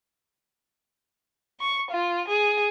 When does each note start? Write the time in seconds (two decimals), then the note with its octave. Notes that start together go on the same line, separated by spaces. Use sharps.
1.60 C#6
1.91 F4
2.28 G#4